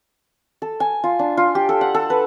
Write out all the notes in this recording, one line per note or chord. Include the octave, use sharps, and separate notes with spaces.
A4
G#5
F4
D4
F4
G4
A4
F#5
A4
B4